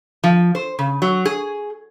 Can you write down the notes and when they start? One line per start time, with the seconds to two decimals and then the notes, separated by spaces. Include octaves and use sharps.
0.24 F3
0.55 C5
0.79 C#3
1.02 F#3
1.25 G#4